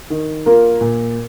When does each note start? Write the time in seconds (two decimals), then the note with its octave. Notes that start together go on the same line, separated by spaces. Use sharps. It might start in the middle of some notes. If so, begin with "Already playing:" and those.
0.10 D#3
0.46 A#3 F4 A#4
0.81 A#2